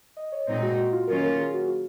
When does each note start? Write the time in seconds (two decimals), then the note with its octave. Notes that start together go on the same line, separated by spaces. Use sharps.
0.17 D#5
0.32 C#5
0.47 A#2 G#3 C4 D#4 C5
0.62 F#4
0.78 F#4
0.92 F4
1.07 D#3 F#3 A#3 C#4 F4 A#4
1.22 A#4
1.39 G#4
1.54 F#4
1.68 F4